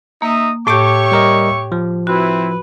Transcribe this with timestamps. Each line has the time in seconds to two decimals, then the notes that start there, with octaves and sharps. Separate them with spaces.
0.22 A#3 D#4 E5 D#6
0.67 A2 G4 C#5 E5 A5 C#6 D6 G6
1.12 G3 A#4 D#5
1.72 F3
2.07 C4 E4 F#4 B4